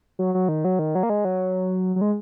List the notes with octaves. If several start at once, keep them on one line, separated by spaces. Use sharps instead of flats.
F#3
F#3
D#3
F#3
D#3
F#3
A#3
G#3
F#3
F#3
G#3